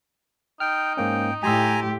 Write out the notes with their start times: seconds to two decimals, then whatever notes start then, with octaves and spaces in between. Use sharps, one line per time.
0.60 D#4 G5 F6
0.97 G#2 A#3 C#4 G5
1.43 A2 G4 G5 G#5 A#5 C6 E6